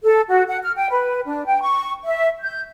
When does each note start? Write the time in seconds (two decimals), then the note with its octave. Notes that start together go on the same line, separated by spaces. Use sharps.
0.03 A4
0.28 F#4
0.48 F#5
0.63 F6
0.75 G5
0.91 B4
1.26 D4
1.46 G5
1.62 C#6
2.03 E5
2.41 G6